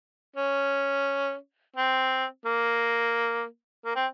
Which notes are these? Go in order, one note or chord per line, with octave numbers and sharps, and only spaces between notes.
C#4
C4
A#3
A#3
C4